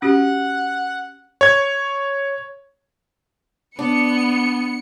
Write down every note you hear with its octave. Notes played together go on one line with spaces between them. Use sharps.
C#4 F#4 G4 F#5
C#5 G#6
B3 D4 C#7